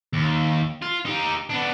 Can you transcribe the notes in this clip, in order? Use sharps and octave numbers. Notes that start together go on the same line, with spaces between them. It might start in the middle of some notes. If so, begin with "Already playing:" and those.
D#2
F4
D#4 G4
B3 D4